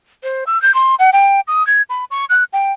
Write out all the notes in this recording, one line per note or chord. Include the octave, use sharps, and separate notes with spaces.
C5
E6
G6
C6
F#5
G5
D#6
G#6
B5
C#6
F#6
G5